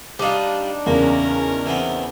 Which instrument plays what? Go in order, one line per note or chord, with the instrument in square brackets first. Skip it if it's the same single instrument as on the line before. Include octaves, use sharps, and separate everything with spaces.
[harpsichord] G3 F4 [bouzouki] D4 D#4
[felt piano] E2 C#3 [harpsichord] A#3 [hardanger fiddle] C#4 A#4
[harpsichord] E3 B3 C4